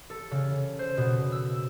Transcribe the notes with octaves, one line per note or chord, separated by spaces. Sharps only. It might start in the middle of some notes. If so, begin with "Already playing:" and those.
A4
C#3
C5
B2
E6